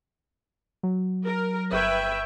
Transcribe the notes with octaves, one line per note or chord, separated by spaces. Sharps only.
F#3
A#4
G1 B4 E5 G5 C#6 G#6